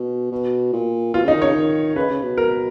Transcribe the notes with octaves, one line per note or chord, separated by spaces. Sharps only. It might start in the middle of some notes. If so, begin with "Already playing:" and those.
Already playing: B2
B2
A#2
B2 F4
C#3 D#4
D#3
C#3 C#5
D#3
C#3 B4
C#3
B2
A#4